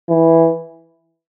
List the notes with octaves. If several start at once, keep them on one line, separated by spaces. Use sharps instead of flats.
E3